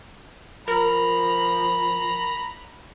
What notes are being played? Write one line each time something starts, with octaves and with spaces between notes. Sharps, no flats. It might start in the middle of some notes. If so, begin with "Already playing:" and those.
F3 A#4 A#5 B5